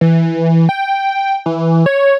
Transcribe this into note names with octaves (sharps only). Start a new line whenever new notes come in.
E3
G5
E3
C#5